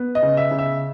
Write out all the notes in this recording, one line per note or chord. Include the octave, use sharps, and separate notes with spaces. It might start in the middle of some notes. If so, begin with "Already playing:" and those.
Already playing: B3
D#5
C#3
E5
C#3
E5